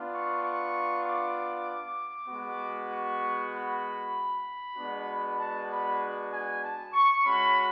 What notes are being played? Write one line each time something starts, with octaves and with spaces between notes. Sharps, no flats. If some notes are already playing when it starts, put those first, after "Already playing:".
Already playing: B3 D4 F4
C#6
C#6
D6
D6
G#3 B3 F#4
C#6
B5
G#3 B3 D4 F#4
A5
B5
G#5
A5
C#6
G#3 C#4 F#4 B5